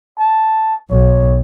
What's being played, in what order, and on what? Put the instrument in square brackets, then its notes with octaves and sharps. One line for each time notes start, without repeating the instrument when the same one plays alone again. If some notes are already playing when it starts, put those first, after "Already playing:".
[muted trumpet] A5
[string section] B1 [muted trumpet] C#5